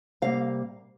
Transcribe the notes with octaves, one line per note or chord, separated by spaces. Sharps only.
C3 G3 A#3 F5